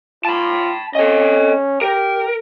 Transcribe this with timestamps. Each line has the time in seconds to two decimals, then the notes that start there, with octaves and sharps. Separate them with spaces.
0.25 F4 A5 B5
0.95 C#4 A4 D#5
1.82 G4 A#4